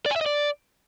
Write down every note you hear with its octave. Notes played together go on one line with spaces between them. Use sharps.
D5
G#5
E5
D#5
D5